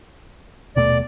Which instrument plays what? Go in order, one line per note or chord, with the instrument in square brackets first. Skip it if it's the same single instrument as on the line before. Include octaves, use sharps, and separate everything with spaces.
[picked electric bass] D#1 B2 A3 [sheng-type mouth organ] D5